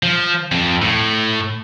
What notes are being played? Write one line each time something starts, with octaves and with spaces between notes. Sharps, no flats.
F3
F2
A2